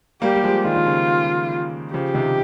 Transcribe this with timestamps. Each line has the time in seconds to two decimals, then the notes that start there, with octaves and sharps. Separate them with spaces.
0.22 G3 A#3 G4
0.35 G3
0.43 F3 G#3
0.65 D#3 G3 F4
0.76 D#3
0.86 C#3 F3
1.94 C#3 F3 G4
2.14 C3 D#3